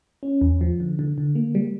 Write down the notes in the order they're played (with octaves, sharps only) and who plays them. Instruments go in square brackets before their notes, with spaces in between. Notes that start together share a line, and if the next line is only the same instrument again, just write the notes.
[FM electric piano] C#4
E2
F3
D3
D3
D3
A#3
G3